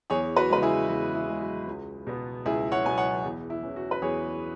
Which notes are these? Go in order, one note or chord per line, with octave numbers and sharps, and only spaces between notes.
E2 G#4 C#5
F#4 B4
C#3 G#3 B4
E4 G#4
E2 F#4
E4
C#3 G#3
F#4
C#2
B2 B3
C#2 E4 G#4
C#5 F#5
B2 B3 G#5
C#5 F#5
E2
E4
E3 C#4
F#4
B4
E2 G#4 C#5